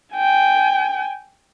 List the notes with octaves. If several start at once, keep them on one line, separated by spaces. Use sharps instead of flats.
G5 G#5